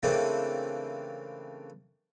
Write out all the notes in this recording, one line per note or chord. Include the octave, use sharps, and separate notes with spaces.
C#3 E3 A3 A#3 C4 D4